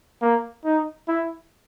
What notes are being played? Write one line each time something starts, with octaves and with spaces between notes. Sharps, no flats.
A#3
D#4
E4